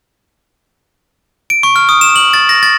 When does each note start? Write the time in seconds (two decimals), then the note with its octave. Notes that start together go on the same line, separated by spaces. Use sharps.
1.50 D7
1.63 C#6
1.76 F6
1.89 D#6
2.01 E7
2.16 F#7
2.34 A6
2.49 A#6
2.63 A6